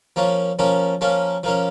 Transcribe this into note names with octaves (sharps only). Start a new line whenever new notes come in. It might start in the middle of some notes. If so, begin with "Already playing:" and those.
F3 A#3 C#4
F3 A#3 C#4
F3 A#3 C#4
F3 A#3 C#4